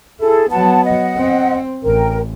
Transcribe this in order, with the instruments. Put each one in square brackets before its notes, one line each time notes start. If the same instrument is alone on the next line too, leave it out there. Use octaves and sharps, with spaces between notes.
[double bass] E4 [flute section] G#4 A4
[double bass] F#3 B3 [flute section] F#5 A5
[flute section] D#5 F#5
[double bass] C4
[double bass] A1 [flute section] A#4 G5